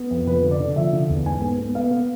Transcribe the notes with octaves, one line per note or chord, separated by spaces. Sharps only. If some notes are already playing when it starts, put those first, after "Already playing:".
Already playing: B3
F2
F3 B4
D3
D5
D3
F3 E5
D3
E2
G#2 G#5
B3
B3
B3 F5
B3